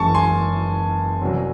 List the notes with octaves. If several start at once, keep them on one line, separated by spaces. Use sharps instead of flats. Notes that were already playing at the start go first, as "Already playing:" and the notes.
Already playing: F#1 F#2 E3 G#3 G#5 A5 C#6
G#5 C6
C2 C3 F#3